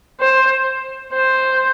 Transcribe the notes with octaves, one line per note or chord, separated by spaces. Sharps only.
C5
C5